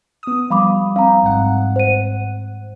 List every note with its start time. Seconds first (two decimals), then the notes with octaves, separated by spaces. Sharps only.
0.23 B3 D#6
0.50 F3 G3 F5 B5 D6
0.96 C4 F5 A#5
1.23 G#1 G#2 F#5
1.76 C5 D#7